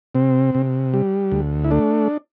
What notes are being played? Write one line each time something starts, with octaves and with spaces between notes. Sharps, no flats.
C3 C4
C3
G3
D2
E4
A3 D4